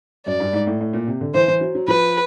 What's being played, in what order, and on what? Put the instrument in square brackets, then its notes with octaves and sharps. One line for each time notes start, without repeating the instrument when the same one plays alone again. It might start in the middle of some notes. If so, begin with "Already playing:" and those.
[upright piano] F#2 [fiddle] D5
[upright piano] G2
G#2
A2
A2
A#2
C3
D3
[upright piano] E3 [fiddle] C5
[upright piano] E3
F#3
F#3
[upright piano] F3 [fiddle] B4